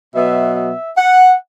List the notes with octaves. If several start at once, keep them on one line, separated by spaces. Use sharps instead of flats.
B2 F#3 B3 E5
E5
F#5